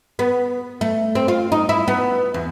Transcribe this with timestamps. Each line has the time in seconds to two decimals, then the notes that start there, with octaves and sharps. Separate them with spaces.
0.19 B3
0.81 A3
1.15 C4
1.28 F4
1.52 D#4
1.69 E4
1.88 B3
2.34 E2